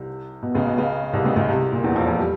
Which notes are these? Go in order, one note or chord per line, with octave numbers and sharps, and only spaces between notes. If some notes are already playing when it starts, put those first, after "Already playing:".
Already playing: C2 C3
B2
C#2 C#3
B2
C#2 C#3
C2 C3
C#2 C#3
C#2 C#3
C2 C3
A#2
E2 E3
F2 F3
F2 F3
G3